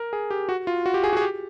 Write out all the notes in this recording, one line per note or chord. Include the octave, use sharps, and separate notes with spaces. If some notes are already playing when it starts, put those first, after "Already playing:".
Already playing: A#4
G#4
G4
F#4
F4
F#4
G4
G#4
F#4
G#4
G4